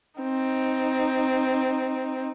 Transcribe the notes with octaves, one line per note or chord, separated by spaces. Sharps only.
C4 D#4